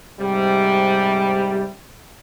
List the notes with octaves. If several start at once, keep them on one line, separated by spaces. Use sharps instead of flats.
G#2 C3 G3